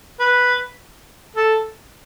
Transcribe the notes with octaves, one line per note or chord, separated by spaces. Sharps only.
B4
A4